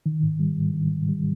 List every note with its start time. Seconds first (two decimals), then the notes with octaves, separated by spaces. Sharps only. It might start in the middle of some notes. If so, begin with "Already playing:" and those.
0.06 D#3
0.23 G#2
0.39 G3
0.57 G#2
0.74 D#3
0.92 G#2
1.09 G3